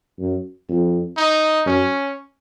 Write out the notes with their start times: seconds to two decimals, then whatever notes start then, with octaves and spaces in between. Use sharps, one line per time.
0.19 F#2
0.69 F2
1.17 D#4
1.66 F#2 C#4